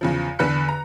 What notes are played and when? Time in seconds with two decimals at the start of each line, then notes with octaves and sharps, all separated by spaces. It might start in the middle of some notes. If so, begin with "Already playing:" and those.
0.01 E2 C#3 F3
0.39 E2 D3 B4 B5 F#6 C#7
0.69 A#5